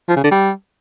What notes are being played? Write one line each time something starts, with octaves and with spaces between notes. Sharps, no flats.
F3
C#3
D3
G3